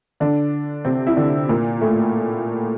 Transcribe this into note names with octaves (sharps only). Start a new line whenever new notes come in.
D3 D4
C3 C4
E4
D3 D4
A#2 A#3
A2 A3